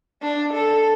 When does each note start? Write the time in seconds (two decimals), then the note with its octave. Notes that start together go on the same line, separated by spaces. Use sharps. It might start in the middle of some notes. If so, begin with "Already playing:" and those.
0.23 D4
0.54 A4